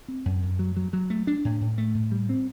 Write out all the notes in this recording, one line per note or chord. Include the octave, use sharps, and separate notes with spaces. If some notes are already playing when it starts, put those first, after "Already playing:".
C4
F#2
F#2
F#3
F#3
F#3
A3
D4
A2
A2
A3
A2
G3
C4